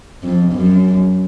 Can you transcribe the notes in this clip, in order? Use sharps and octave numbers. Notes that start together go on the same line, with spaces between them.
F2
F#2